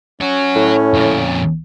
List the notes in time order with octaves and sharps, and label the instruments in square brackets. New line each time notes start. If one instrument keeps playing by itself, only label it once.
[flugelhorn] C#4 [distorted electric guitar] C#5 F#5
[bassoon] A2
[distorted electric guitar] F2 A#2